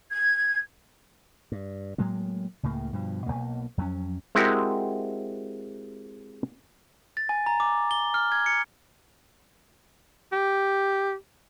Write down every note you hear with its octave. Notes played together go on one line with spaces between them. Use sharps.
G#6
G2
A2 F#3 G#3 A#3
C#2 A2 C#3 A#3
G2 B2 F3
B1 G2 B2 A#3
F2 F#3 A3 C#4
G#3 C4 E4 F#4 G4 A#4
A6
G#5
A#5
D6
G7
F6
G#6
C#7
G4